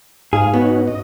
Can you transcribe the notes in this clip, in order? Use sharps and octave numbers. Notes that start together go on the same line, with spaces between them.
G#2 G#3 G#4 F5
B3 C#4 D#4 F#4
D#5